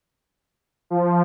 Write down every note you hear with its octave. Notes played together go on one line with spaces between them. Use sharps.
F3